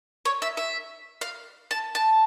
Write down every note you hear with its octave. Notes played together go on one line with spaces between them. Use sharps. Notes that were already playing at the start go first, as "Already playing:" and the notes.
C#5
E5
E5
F5
A5
A5